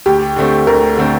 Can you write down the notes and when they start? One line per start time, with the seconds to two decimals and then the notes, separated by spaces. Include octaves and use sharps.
0.06 D2 G4
0.36 D3 A3 C4
0.67 D2 A#4
0.97 D3 A3 C4